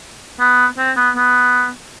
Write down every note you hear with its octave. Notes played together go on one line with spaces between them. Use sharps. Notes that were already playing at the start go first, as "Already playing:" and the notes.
B3
C4
B3
B3